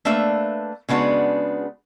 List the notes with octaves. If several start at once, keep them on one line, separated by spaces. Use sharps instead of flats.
A3 A#3 D4 B4 E5
C#3 G#3 B3 D4 F#4